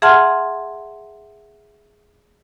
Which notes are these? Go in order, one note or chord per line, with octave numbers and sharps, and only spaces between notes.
G#4 E5 F#5 A5 C6 F6